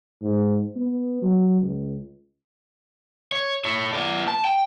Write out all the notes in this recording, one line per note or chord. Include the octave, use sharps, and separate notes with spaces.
G#2
B3
F#3
C#2
C#5
A4 C#5
B3 D5
A5
G5